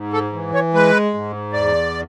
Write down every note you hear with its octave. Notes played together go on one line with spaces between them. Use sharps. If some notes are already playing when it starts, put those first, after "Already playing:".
Already playing: G#2
A4
E3
C#5
G#3 B4
G#2
E2 D5